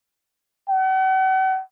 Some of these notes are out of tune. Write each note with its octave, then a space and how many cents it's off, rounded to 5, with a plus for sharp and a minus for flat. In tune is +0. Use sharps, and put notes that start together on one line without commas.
F#5 +40